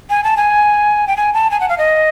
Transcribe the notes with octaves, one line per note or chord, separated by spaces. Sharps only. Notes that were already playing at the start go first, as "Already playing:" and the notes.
G#5
A5
G#5
G5
G#5
A5
G#5
F#5
F5
D#5